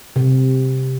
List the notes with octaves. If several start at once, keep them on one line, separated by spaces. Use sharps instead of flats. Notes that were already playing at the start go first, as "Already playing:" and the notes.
C3